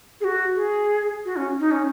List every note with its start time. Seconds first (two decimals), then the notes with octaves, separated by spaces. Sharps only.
0.21 G#4
0.24 F#4
0.56 G#4
1.25 F#4
1.36 C#4
1.60 D#4
1.71 C#4